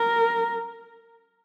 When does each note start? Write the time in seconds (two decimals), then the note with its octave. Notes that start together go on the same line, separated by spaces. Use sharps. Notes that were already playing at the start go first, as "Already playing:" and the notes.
Already playing: A#4